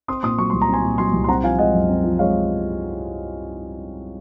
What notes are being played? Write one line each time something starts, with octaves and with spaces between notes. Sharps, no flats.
C4 C6 D#6
A#2 C6 D#6
F#3 C#6
C2 C6
A#5
C4 G#5 C6
A#2
F#3 G#5 C6
C2
C6
C4 F#5 A#5
F3 F5 G#5
G#3 D#5 F#5
F#2
C4
F3
G#3 C#5 F5